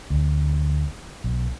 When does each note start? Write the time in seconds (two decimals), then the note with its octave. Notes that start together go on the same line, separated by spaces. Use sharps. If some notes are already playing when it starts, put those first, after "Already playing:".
0.10 D2
1.24 B1